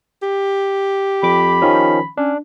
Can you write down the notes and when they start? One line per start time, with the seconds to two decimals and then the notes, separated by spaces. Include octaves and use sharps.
0.23 G4
1.23 F2 B5 D6
1.62 D#3 F3 C#4
2.17 C#4 D4